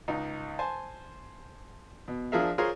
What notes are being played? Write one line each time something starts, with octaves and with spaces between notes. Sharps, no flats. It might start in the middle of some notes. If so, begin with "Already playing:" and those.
C#2 D#4
C5 G#5 A5
B2
F3 D4 G#4 A#4 E5 F5
F4 G#4 A#4 C5 C#5